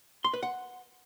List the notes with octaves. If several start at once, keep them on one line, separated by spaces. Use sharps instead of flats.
C6
B4
F#5